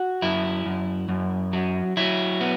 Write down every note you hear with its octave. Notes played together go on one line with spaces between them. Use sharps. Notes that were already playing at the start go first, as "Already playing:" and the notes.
Already playing: F#4
F#2 E4
F#2
F#2
F#3
F#3 E4
B3